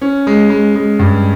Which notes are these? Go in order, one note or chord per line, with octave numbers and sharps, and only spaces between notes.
C#4
G#3
G#3
G#3
G2